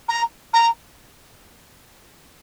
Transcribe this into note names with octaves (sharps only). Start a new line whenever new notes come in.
A#5
A#5